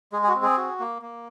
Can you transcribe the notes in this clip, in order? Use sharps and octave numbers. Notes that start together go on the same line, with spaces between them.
G#3 G#4
G#4
F#4
C4
G#4
F#4
A#3
A#3